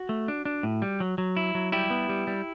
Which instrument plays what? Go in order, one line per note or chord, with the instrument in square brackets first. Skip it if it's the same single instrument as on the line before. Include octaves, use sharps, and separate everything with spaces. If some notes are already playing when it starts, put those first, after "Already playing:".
Already playing: [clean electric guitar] F#4
A3
D4
D4
A2
G3
F#3
F#3
E4
F#3
G3 E4 G4
B3
G3
G3